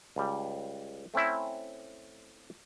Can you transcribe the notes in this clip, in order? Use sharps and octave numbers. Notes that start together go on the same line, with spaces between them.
C#2 G3
A3 C4 C#4 E4